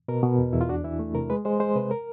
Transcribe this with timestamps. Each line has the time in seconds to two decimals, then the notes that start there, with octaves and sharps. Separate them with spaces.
0.08 B2 A#4
0.23 B2
0.38 E2
0.53 E2 E4
0.61 F4
0.69 D4 F#4
0.84 E3 E4
0.99 A3
1.14 C3 A#4
1.30 G#3 B4
1.45 G#3 C5
1.60 G#3 C5
1.75 C3 B4
1.91 A#4